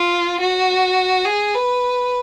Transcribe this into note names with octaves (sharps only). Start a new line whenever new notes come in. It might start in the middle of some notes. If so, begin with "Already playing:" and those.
Already playing: F4
F#4
G#4
B4